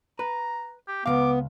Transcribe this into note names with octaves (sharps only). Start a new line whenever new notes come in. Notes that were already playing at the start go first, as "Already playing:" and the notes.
B4 A#5
G4
C#2 C3 B3 F5 D6